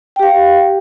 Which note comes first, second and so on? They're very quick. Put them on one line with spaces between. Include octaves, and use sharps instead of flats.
G5 G4 F5